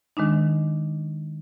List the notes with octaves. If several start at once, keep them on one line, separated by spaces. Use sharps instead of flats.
D#3 G#3 D4 D#4